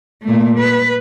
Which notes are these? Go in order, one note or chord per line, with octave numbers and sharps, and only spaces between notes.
A#2 A3
B4